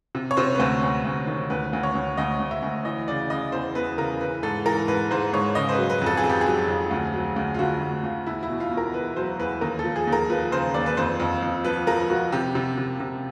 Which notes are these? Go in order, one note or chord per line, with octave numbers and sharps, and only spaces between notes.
C3
C#5
C3 C5
B4
D2 C5
D2
D2
D#3
D2 B4
D2
C#5
D2
D2 D#5
D2
E5
D2
E3 D#5
C#3 D5
C#3 D#5
E2 C5
E2 B4
C#3 A#4
E3 B4
G#2 A4
E3 A#4
G#2 B4
G#2 C5
G#2 C#5
C#3 D#5
C5
B4
F#3
B4
F2 A4
G#4
F2
G4
G#4
F#3
F2
D2
F#3
D2
F4
D3 F#4
D2
D2 F4
E2 E4
E4
B2
F4
B2
A#4
E2 B4
F#3 C5
E2 B4
D#2 A#4
F3 A4
G#4
D#2
A#4
F3 B4
C#3 C5
D#2 D5
B4
F2 C5
F2
F2
F3 B4
F3 A#4
F3 F#4
C3 G4
C3
C3
C3